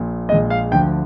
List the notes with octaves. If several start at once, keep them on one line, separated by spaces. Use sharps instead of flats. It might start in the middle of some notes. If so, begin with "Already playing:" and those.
Already playing: A#1 A#2
A#1 A#2 G#3 D#5
F5
D2 D3 F3 G5